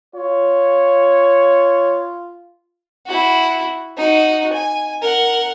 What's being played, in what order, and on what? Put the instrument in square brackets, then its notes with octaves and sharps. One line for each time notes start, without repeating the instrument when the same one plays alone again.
[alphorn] F4 [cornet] C#5
[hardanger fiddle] E4 F#4
D#4 F#4
G#5
A#4 F#5